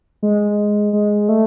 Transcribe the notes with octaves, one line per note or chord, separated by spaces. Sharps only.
G#3
G#3
A3